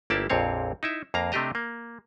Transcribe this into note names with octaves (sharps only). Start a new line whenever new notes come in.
G1 A#3 E4 G4 D5 A5
A#1 F2 A#2 C4 C#5 F5
D#4 E4 E5
F2 A#3 F5 A#5
C3 A3 D4 G4 D#5 A#5
A#3